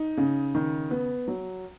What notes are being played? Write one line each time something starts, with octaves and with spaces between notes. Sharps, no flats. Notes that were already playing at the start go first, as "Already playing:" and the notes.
Already playing: D#4
C#3
D#3
B3
F#3